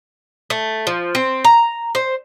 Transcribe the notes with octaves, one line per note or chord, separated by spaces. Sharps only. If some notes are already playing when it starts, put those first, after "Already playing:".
A3
F3
C4
A#5
C5